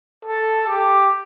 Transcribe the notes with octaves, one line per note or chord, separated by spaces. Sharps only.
A4
G4